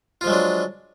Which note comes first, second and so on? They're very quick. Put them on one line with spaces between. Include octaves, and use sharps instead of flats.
F4 F3 G#3 F#3 D4